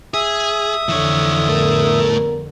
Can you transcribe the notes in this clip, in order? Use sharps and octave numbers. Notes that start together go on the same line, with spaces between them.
G#4 E5 D#6
F2 D3 E3 C#5
A2 G3 B3 A4 A#4